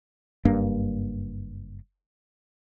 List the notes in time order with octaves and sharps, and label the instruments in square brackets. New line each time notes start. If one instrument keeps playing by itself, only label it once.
[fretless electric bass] F#1 G2 A#3 D4